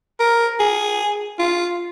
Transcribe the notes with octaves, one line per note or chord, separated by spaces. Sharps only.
A#4
G#4
F4